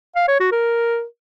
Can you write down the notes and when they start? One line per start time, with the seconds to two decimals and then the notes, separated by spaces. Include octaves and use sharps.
0.16 F5
0.28 C#5
0.40 F#4
0.52 A#4